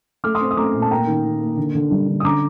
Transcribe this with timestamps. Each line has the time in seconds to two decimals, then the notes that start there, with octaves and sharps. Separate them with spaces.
0.24 A3 D6 F6
0.35 C6 D#6
0.41 C4
0.51 D#6
0.57 A3 A#5 D6
0.74 A#2
0.82 A5
0.91 A#3 G5 A#5
1.07 D#3
1.25 D#3
1.41 A#3
1.57 D3
1.75 D3
1.91 G3
2.08 D3
2.20 D#6
2.25 D3 A#5 D6